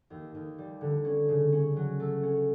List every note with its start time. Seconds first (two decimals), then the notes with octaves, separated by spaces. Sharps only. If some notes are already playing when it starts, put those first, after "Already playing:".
0.10 D#2
0.35 D#2
0.58 G3
0.81 D3
1.05 C#4
1.29 C#3
1.52 C#4
1.76 F#3
2.00 A3
2.23 C#4